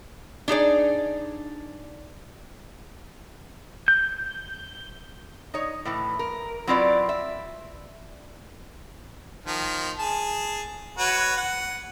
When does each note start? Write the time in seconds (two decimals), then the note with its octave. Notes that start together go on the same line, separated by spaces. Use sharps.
0.48 D4 D#4 G#4 D5
3.88 G6
5.54 D#4 C#5
5.85 A2 E3
6.19 A#4
6.67 F#3 C4 E4 F4 B4 D5
7.09 E5
9.46 D#3 F3
9.99 G#4 A5
10.98 F#4 B4 C#5
11.37 F#5